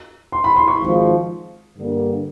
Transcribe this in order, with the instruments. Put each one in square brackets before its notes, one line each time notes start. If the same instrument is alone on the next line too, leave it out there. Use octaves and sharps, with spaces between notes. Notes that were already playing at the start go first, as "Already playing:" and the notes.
[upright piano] C6
B5
C6
C#6
[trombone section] G#1 G#2 F3
G2 D3 G3 A#3